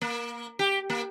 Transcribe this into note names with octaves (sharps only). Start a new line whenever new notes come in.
A#3
G4
A#3